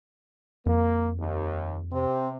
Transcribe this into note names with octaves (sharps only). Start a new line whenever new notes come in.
F2 A#3
D#2
C3 C4